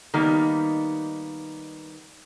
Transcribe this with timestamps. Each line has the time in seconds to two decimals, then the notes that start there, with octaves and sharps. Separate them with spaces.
0.14 D#3 G3 A#3 B3 D#4